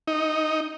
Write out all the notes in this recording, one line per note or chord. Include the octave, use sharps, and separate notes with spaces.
D#4